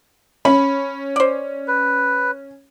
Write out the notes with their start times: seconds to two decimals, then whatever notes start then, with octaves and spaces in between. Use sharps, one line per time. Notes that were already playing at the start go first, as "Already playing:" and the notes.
0.45 C#4 B5
1.16 C5 D5
1.68 B4